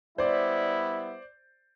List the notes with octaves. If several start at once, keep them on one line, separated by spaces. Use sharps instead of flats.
G3 B3 E4 C5 D5